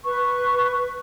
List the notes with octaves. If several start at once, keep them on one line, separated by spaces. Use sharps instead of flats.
B4 C#6